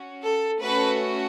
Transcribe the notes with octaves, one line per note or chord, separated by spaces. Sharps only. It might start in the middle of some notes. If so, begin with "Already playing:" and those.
Already playing: C#4 F#4
A4
A3 C#4 F#4 A4 B4